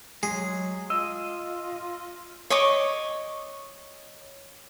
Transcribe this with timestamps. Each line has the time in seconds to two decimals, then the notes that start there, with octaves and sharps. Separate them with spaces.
0.23 F#3 G#3 G#4
0.90 F4 D#5 E6
2.50 C#5 D#5 C#6 D6